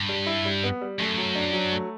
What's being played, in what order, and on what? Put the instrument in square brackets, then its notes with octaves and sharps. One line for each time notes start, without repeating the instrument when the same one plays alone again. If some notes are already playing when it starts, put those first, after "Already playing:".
Already playing: [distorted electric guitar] G2
[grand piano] G3
E4
G3
B3
G3
[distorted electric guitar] F#2 [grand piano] A3
[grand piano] F#3
D4
F#3
A3